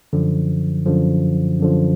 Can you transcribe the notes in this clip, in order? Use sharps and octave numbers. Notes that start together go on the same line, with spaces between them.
F#2 D3 F3
F#2 D3 F3
F#2 D3 F3